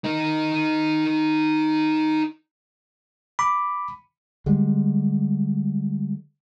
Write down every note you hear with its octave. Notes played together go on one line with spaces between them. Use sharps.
D#4 A#4
B5 D6
D3 G3 G#3